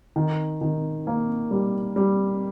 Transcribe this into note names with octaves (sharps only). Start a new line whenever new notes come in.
D#3
D#3
A#3
G3
G3